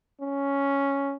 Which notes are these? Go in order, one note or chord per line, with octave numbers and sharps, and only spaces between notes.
C#4